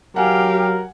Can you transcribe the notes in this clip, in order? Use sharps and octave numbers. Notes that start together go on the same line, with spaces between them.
F#3 G4 A#4 F5 F#5 G#5